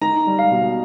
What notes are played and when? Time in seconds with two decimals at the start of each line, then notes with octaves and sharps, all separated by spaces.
0.01 D#4 A#5
0.27 G3
0.39 F5
0.51 B2